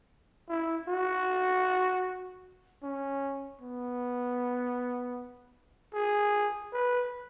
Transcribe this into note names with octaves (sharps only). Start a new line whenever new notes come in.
E4
F#4
C#4
B3
G#4
B4